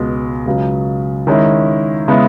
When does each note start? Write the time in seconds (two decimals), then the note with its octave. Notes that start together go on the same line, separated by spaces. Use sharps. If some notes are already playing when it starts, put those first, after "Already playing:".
Already playing: C#2 B2 G#3
0.46 C#2 C#3 F#3
1.27 D#3 G#3 C#4 E4
2.08 C#3 G#3 B3 E4